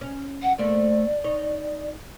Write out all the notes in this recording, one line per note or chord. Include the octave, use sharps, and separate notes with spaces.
C#4
F#5
A3 A#3 C4 D5
D#4 C#5